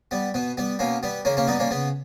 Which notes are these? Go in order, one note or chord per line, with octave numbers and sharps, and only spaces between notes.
G3 B3
B2 B3
G3 B3
B2 A#3 C#4
G3 B3
C#3 A#3 C#4
A#3 C#4
G3 B3 D#4
A#3 C#4
C#3 B3